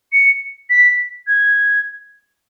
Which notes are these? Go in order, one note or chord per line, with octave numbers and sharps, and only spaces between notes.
C#7
B6
G#6